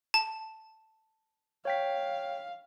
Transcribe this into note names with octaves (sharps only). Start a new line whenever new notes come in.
A5
C#5 F5 G5 B6